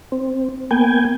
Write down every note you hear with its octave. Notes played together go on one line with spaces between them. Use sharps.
C4
A#3 B3 G5 G#5